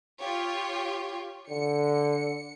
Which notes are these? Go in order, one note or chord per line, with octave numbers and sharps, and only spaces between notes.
F4 G4 C#5
D3 C#7